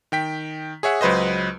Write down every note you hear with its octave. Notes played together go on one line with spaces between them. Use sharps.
D#3 G5 B6
G#4 C#5 E5 F#5
C#2 F#3 B4 C5 D#5